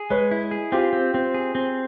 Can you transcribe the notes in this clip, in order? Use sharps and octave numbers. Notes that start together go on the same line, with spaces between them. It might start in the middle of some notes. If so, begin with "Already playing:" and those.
Already playing: G#4
G#3 B4 C#5
E4
G#4
C4 F4 G4
C4
C4
G#4
C4